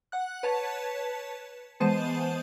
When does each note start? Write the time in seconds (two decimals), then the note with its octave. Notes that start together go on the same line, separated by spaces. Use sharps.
0.12 F#5 F#6
0.43 B4 C#5 A5
1.80 E3 G#3 B3 C5 A5 D#7